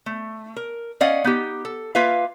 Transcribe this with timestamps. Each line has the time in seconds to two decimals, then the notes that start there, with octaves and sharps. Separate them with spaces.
0.06 A3
0.56 A#4
1.01 C#4 D5 D#5 F5 F#5
1.24 B3 D#4 G4
1.65 A4
1.95 A#3 F4 B4 E5 F5